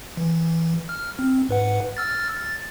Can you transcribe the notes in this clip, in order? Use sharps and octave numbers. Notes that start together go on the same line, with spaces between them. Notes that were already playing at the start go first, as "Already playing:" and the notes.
E3
F6
C4
G#2 B4 F#5
E6 F6 A6
A6